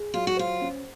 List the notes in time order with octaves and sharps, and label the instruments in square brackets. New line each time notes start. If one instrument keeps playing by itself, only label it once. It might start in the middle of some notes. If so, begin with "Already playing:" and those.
Already playing: [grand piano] G#4
[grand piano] F#3 [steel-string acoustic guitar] F4
[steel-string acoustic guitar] F#4
[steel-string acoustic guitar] F4 [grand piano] C5
[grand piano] C#4